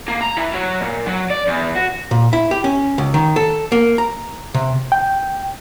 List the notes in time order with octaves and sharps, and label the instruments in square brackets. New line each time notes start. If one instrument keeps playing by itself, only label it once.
[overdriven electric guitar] A#3
A#5
E3
F#3
A#2
F#3
D5
E2
F#4
[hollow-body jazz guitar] A#2
E4
G4
C#4
C#2
D#3
A4
A#3
A#5
C3
[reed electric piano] G5